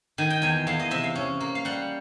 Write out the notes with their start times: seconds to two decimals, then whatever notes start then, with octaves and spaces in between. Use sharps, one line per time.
0.18 D#3 G#5
0.30 G5
0.42 E2 G#5
0.67 E2 F5
0.80 D#5
0.91 C3 E5
1.04 F5
1.15 C#4
1.40 A#3
1.55 F5
1.65 G3 F#5